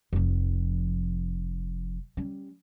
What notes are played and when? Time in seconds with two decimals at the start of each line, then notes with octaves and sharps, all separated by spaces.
0.13 F1 F3
2.17 G3 C#4